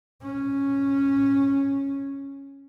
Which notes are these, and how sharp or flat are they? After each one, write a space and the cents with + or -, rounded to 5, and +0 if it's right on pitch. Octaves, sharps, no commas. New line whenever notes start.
C#4 -5